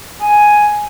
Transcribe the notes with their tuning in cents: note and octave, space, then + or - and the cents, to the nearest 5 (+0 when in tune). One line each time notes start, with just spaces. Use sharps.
G#5 +5